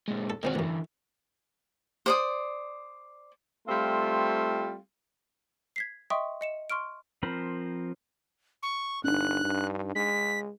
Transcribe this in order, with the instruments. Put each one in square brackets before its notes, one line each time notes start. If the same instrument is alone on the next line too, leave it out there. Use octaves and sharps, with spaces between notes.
[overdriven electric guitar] A#2 G#3
[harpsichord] A4
[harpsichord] D#3 C4 C#4 [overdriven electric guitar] G#3 F#4
[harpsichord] A1 F#2 [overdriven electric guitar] D3 E3
[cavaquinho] C5 D5 D#6
[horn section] G3 A3 C4 F4
[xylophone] G#6 B6 C7
D#5 E5 G5 C6 C#6 D#6
D#5 C#7 E7
C6 C#6 F6 D7
[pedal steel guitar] F3 C4 A#4 C5 B5
[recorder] C#6
[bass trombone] G1 [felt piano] D4 D#4 [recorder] F#6
[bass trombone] G2
[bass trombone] G#3 [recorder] B6